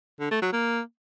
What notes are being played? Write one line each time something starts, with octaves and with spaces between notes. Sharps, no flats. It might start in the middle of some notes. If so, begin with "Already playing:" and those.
D3
A3
F#3
A#3